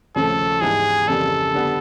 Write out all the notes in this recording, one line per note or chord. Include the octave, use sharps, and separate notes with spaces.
D#2 C#3 F3 A3 C#4 A4
G#2 E3 G3 B3 E4 G#4
F2 C#3 E3 G3 A#3 A4
D3 G3 B3